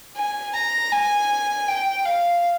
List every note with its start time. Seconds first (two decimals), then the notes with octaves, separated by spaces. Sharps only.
0.16 G#5
0.54 A#5
0.92 G#5
1.68 G5
2.05 F5